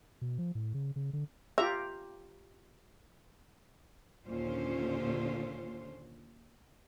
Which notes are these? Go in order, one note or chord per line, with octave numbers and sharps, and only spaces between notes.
B2
F3
A2
C#3
C#3
D3
F4 G4 E5 A#5
D#2 A#2 D3 C#4 F4 C5